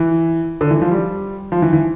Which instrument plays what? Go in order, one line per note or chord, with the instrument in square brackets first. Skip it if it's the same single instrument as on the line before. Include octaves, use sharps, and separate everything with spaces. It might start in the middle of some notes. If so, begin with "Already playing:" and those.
Already playing: [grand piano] E3
D3
E3
F3
G3
F3
E3
E3